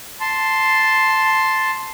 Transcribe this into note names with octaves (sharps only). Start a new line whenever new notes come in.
A5 C6